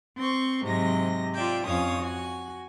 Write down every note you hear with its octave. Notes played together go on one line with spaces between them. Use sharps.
C4 C6 C#6
G#2 C3 F#3 D#5 A#6
F4 D5 E5 G5
F2 C#4 C#5 F5 D#6
F#4 G#5